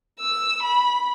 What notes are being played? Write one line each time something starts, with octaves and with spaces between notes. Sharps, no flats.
E6
B5